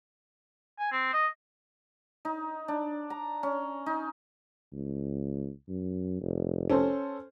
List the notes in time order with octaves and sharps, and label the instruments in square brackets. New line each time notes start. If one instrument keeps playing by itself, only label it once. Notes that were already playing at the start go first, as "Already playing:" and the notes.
[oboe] G#5
C4
D#5
[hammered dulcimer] D#4
D4
A#5
C#4
D#4
[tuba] C#2
F#2
F1
[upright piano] C#4 A4 C5